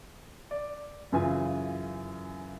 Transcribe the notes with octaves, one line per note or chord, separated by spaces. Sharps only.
D5
F#2 C#3 E3 F4 G#5